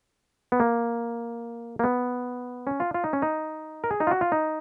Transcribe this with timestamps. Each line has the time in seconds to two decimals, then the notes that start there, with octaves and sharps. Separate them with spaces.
0.52 B3
0.60 A#3
1.79 A#3
1.84 B3
2.67 C#4
2.80 F4
2.94 F4
3.04 D#4
3.13 C#4
3.22 D#4
3.84 A#4
3.91 G#4
4.00 D#4
4.07 F4
4.11 F#4
4.21 F4
4.32 D#4